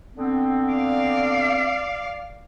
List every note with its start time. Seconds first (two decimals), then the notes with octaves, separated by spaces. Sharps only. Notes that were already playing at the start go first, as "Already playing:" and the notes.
0.16 D3 B3 C4
0.72 D5 F5